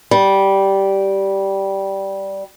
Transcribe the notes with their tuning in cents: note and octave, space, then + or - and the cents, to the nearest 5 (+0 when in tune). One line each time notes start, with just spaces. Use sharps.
G3 -10